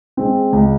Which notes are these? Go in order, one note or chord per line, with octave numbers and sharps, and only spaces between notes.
G#3 C4
C#2